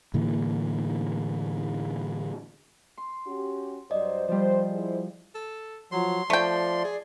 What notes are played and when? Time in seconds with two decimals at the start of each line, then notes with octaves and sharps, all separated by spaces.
0.14 A2 D3 E3 A#3
2.98 C6
3.27 C#4 F#4 G4
3.91 G2 F#3 C5 D5 D#5
4.28 F3 G3 C5
4.72 E4 G#4 C5
5.35 A4
5.92 F3 F#3 C6
6.30 F3 A3 D5 G5
6.84 G#4